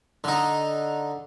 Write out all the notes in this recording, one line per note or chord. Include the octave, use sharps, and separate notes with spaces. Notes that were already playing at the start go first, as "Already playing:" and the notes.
D3 D#4